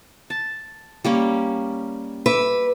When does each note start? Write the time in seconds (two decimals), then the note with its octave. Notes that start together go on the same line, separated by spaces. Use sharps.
0.30 A5
1.04 G3 A#3 C#4
2.26 B4 E5 D6